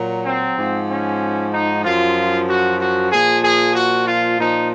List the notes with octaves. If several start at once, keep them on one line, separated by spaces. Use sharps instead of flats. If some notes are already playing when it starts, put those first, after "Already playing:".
Already playing: A#2 F#3
C4
G#2 F3
C#4
D#4
F#2 F3 F4
F#4
F#4
A#2 F3 G#4
G#4
F#4
F4
A#2 F3 D#4